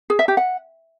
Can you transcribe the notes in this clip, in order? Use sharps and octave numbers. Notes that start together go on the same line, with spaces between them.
G#4
E5
G4
F#5